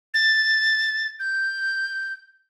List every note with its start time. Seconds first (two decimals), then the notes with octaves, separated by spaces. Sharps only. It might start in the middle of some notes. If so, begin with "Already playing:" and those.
0.14 A6
1.19 G6